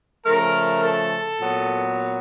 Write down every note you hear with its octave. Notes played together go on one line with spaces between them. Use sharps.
C#3 F3 A3 A#4
A4
A#2 F#3 B3